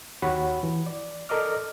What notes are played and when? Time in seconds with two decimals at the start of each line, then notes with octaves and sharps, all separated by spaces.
0.22 D#2 F#4 G4 C#5 F#5 B5
0.63 E3
0.86 D5
1.29 A4 A#4 D5 D#5 D6 F6